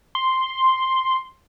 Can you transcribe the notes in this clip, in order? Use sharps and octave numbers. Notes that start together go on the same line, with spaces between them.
C6